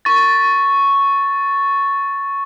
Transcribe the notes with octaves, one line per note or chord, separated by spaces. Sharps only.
C#6 A6